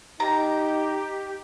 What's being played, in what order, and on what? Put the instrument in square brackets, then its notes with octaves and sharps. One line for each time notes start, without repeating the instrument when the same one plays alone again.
[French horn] D#4 [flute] G4 [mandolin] A#5